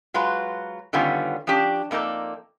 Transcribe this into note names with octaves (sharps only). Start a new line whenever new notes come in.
F#3 G#3 F4 F#4 B4
D3 D#3 G3 B3 C#4 F4
F3 C#4 D4 G4
F2 A#3 D#4 A4 D5